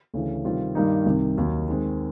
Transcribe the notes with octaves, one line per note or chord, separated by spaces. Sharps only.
D2 C#3 E3
C3 D#3 G3 C4 F4
G2 D#3 G3 A#3 D#4
C2 C3 D#3
D#2 D#3 F#3
D#3 G#3 C4